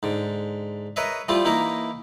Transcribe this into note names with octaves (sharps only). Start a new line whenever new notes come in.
G#2 D3
A#4 B4 C#5 D#5 E5
F3 G3 A3 E4 F4
E3 A#3 D#4 E4 A#4